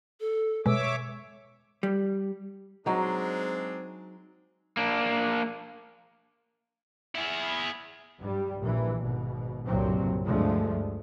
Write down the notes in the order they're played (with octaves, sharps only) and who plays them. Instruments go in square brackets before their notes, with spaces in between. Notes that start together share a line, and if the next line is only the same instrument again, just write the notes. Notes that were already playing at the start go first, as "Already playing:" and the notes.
[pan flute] A4
[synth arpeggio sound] B2 G#3 [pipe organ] C#5 E5 D6 [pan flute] E6
[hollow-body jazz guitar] G3
[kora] F#3 D#4 [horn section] G#3 C4 D4
[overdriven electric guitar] A#3 D4
[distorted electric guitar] E4 G#4
[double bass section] G2 G3
A#1 E3
G#1 B2
F#1 C2 G2 A#2 F#3 C4
D2 G2 D3 F3 G#3 A3